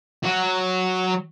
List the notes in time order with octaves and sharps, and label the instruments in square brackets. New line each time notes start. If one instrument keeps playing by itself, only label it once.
[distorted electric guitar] F#3 F#4